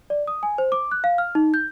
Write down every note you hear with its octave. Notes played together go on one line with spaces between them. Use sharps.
D5
D#6
G#5
C5
D6
F#6
F5
F6
D#4
G6